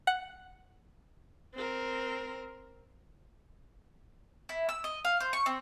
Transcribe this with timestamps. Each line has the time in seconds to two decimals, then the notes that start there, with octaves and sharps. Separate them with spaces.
0.07 F#5
1.55 C4 A#4
4.49 E4
4.69 E6
4.84 D#5
5.05 F5
5.20 C5
5.33 C#6
5.46 C4